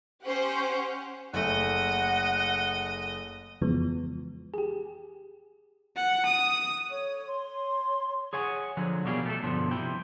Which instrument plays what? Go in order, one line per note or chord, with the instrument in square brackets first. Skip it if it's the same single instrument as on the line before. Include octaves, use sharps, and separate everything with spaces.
[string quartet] C#4 F#5 [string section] G4 C5
[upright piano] F#1 A3 [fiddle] D#5 [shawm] F#5
[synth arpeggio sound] F2 C#3 E3 F3 G#3 B3
G4 G#4
[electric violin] F#5
D#6
[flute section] A4 C#5 C#6
C#5 C6
[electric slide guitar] G#4 C#5 F#5 G#5
D3 F3 F#3
B2 F#3 G3 A#3 G4 G#4
A3 A4
G2 B2 D3 F3
C3 E4 G5